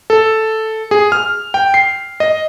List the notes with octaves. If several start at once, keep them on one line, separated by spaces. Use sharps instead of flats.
A4
G#4
F6
G5
C7
D#5